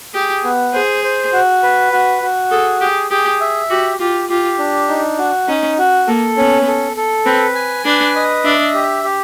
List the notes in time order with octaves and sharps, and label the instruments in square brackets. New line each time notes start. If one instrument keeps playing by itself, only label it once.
[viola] G4 [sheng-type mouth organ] G#4
[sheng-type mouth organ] B3
[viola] G#4 [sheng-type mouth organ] C5
[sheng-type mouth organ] C5
F#4
B4
F#4
F#4
[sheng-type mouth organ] G#4 [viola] A4
[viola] G4 [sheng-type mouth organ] G#4
[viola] G4 [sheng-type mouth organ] G#4
[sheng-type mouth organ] E5
[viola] F#4 [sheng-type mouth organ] G4
[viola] F4 [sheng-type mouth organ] G4
[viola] F4 [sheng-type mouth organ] G4
[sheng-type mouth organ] D4
D#4
F#4
[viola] C#4 [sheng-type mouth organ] D#4
[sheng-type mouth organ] F#4
[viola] A#3 [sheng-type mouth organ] A4
[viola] B3 [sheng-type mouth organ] C#4
[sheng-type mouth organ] A4
A4
[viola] C4 [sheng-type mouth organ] B4
[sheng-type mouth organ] G#5
[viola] D4 [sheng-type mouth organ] B4
[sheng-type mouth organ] D#5
[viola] D4 [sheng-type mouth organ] E5
[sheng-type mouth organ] G4
G4